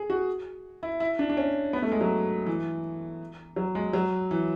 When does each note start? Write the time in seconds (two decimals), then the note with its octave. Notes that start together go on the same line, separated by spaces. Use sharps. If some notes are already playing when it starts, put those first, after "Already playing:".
Already playing: G#4
0.10 F#4
0.83 E4
1.00 E4
1.19 D4
1.30 D4
1.37 C#4
1.73 B3
1.82 A3
1.92 G#3
2.01 F#3
2.47 E3
3.56 F#3
3.75 G#3
3.93 F#3
4.31 E3